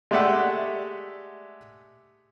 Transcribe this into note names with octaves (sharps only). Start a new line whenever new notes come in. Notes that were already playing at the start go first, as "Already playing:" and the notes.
G#3 A3 G4 D5 E5 F#5